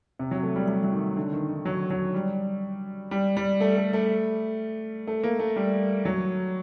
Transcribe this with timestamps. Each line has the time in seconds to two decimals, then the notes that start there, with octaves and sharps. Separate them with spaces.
0.19 C3
0.31 F#3
0.43 A3
0.56 G3
0.68 G3
0.83 F#3
0.92 D#3
1.17 D3
1.33 D#3
1.49 D#3
1.65 F#3
1.90 F#3
2.14 G3
3.11 G3
3.37 G3
3.61 A3
3.77 A3
3.93 A3
5.07 A3
5.23 A#3
5.39 A3
5.56 G3
6.05 F#3